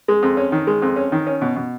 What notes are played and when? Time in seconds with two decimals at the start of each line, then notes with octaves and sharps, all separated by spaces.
0.08 G#3
0.22 F2
0.37 C#4
0.52 D#3
0.67 G#3
0.82 F2
0.96 C#4
1.12 D#3
1.27 C#4
1.41 B2
1.56 B2